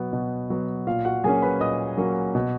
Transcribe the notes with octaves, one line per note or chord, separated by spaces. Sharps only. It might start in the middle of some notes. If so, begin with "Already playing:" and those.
Already playing: B2 F#3 B3
B2
F#3 B3
A#2 F4 F5
F#4 F#5
F#3 A#3 C#4 G#4 G#5
B4 B5
A#2 D#5 D#6
F#3 A#3 C#4
B2